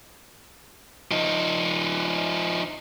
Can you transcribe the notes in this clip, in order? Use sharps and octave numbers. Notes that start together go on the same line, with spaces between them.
F3 D#4